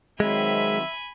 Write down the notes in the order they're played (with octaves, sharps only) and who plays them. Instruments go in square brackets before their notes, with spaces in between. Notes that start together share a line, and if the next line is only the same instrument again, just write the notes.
[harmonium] D#3 F#3 C4 [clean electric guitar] G#3 [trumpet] E5 [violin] G#5 B5